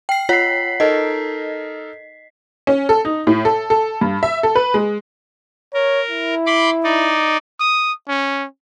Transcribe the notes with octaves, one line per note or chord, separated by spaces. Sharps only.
G5 C7
F4 C#5 F#5 B6 C7
D#4 A4 A#4 D#5
C#4
A4
D#4
A2
A4
A4
G2
E5
A4
B4
G#3
A#4 C#5
E4
B5 C6 D6
D#4 D5
D#6
C#4